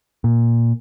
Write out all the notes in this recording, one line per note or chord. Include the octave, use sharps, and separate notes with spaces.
A#2